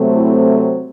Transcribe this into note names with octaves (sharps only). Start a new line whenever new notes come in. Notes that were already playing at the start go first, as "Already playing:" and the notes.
Already playing: C3 F#3 A3 C4
E4